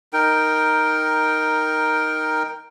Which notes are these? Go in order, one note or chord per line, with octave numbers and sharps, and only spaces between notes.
D#4 A#4 G5